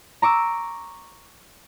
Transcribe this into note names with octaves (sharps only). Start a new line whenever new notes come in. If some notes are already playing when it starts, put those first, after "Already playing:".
A#5 C#6 D6 E6